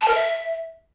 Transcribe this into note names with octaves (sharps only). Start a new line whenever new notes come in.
A5
A#4
E5